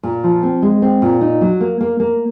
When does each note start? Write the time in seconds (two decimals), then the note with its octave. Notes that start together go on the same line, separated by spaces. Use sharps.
0.03 A#2
0.24 F3
0.43 C4
0.62 G#3
0.82 C4
1.02 A#2
1.21 D#4
1.41 F#3
1.61 A#3
1.81 A#3
2.00 A#3